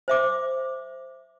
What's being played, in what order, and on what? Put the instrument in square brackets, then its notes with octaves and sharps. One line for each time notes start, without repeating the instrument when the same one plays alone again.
[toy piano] C5 E5 D6